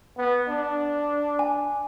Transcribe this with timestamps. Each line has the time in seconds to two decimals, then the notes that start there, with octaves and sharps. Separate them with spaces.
0.18 B3
0.48 D4
1.39 G#5